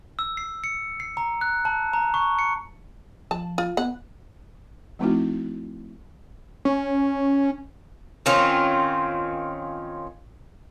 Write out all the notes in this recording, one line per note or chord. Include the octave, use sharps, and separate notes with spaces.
E6
C7
C#7
C7
A#5
F#6
A5
A#5
C#6
C#7
F3 A5
F4
B3 F#5
F3 A3 C4 D#4 E4 F#4
C#4
D#3 C4 C#4 F4